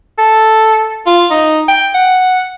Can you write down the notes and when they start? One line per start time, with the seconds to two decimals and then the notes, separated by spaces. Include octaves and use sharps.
0.18 A4
1.07 F4
1.31 D#4
1.69 G5
1.95 F#5